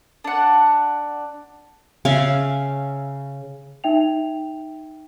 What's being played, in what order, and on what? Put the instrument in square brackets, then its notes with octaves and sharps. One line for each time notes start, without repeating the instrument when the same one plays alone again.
[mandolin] D4 F#5
[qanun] C#3 C#4 E5 F5
[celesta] D#4 E5 G5 F7